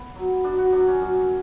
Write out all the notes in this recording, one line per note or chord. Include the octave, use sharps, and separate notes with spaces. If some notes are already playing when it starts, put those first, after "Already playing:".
Already playing: B3
F#3
B2 D4
F#4
F#3 D4
C#4
F#2